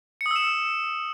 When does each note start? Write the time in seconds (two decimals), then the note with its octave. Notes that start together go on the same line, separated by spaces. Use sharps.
0.21 C#7
0.26 D#6
0.31 E6
0.36 E7